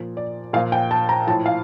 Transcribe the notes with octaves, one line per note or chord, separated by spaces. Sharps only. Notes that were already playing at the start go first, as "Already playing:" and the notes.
Already playing: A#2 F3
D5
A#2 F3 F5
G5
A5
A#5
A2 F3 A5
F5